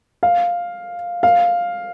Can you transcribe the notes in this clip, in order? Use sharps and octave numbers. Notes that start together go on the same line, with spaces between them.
F5
F5